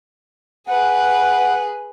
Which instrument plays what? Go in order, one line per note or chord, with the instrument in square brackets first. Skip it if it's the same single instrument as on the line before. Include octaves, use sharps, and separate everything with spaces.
[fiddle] G#4 B4 [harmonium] F#5